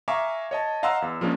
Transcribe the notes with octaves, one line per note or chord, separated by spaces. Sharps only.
E5 F5 G#5 A#5 C#6 D6
C#5 D#5 A5
D#5 F5 F#5 A#5 C6 E6
E2
F3 G#3 A#3 C#4 D4